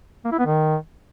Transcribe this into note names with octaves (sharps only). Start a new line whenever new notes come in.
A#3
E4
B3
D#3